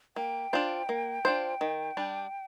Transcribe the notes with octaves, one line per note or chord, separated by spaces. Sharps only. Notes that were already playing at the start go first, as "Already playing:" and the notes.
A#3 G5
D4 F4 C5
A#3
D4 F4 C5
D#3
G3 D4